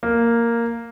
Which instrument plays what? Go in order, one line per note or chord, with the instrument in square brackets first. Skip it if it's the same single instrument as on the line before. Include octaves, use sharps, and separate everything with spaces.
[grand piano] A#3